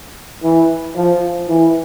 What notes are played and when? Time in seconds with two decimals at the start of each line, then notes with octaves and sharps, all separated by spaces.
0.43 E3
0.96 F3
1.49 E3